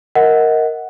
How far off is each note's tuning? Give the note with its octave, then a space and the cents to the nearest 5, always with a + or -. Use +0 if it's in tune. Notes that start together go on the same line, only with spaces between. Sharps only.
A#4 +0 D#5 +25 F#5 +0